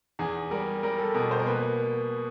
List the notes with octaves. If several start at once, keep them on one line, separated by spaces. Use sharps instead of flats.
E2 G#4
G3 A#4
G3 A#4
A4
B2 A#4
C5
A#4
A#3 B4